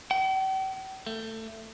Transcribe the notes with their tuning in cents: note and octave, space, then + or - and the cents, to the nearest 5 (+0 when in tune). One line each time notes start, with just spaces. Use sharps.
G5 -45
A3 +20